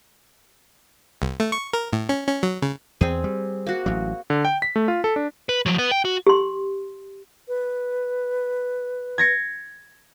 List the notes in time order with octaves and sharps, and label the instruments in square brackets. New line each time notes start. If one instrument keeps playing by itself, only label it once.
[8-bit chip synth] C2
A3
C#6
A#4
A2
C#4
C#4
F#3
C#3
[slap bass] E2 [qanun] C4 G#4
[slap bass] G3
[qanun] A#3 F#4
[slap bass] A1 F#3
[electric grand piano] D3
G5
B6
A3
F4
A4
D4
[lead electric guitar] B4
F3 F#3
B3 B4
G5
F#4
[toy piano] G4 C6
[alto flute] B4
[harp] G#6 A#6 C#7